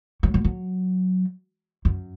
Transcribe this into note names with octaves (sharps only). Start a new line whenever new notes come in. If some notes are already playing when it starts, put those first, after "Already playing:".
F#3
F#3
F#3
F#2